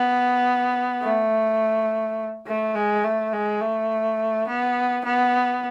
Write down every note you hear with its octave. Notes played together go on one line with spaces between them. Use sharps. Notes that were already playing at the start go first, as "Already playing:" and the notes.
Already playing: B3
A3
A3
G#3
A3
G#3
A3
B3
B3